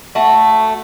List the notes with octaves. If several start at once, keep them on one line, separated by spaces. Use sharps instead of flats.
A3 F#4